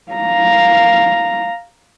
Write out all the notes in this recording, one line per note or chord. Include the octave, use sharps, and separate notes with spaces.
F5 A#5